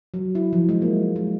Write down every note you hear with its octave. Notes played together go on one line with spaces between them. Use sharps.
F#3
E4
F3
G#3
A#3
G#3